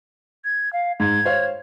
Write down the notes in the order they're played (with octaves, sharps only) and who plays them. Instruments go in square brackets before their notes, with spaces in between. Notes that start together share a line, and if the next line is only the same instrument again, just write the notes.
[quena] G#6
F5
[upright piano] G#2 [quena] G#6
[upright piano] C5 C#5 F5